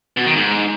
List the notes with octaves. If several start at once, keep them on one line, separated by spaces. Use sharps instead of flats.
B2
D#3
G#2